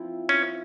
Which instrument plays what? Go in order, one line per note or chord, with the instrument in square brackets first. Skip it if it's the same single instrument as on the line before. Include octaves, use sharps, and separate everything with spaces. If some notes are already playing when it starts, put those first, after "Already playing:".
Already playing: [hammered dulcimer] F3 C4 E4
[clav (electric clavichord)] C#4